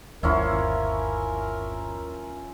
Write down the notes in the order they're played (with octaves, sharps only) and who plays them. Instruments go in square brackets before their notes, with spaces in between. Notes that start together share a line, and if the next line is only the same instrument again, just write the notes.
[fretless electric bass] G1 D#2 [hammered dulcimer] F3 C#4 E4 [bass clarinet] A#4